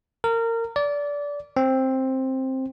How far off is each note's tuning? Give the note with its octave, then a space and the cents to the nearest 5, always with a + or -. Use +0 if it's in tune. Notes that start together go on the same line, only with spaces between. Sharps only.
A#4 -25
D5 -20
C4 +10